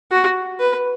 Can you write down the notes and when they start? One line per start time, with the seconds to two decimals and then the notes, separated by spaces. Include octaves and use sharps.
0.11 F#4
0.60 B4